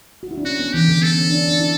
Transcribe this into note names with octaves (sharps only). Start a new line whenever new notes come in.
F#4
E4
D4
C#4 F#4
B3
E3 G4
D3
B3 A4
C#4
D4
D4
E4